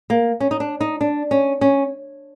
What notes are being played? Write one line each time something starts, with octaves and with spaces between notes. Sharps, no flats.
A#3
C#4
D#4
D4
D#4
D4
C#4
C#4